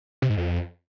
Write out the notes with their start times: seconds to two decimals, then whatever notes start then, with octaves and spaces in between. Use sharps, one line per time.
0.22 C3
0.30 G#2
0.37 F2